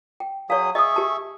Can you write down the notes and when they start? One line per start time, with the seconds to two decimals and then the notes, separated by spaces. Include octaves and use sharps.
0.20 G5
0.50 F#3 G#4 C#5 F5 D#6
0.75 G#4 D#5 E5 C#6 D#6
0.96 G4 A5